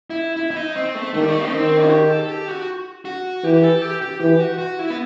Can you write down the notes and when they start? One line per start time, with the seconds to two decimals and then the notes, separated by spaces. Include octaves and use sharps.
0.10 E4
0.37 E4
0.51 E4
0.56 D#4
0.76 C4
0.95 A3
1.13 D#3 A3
1.20 G3
1.29 A3
1.47 D#4
1.52 D#3 C4
1.84 F#4
1.90 G4
2.10 A4
2.22 A4
2.29 G4
2.48 F#4
3.05 F#4
3.44 E3 G4
3.54 G4
3.63 A4
3.82 G4
4.02 G4
4.20 E3 G4
4.40 F#4
4.58 F#4
4.79 E4
4.90 B3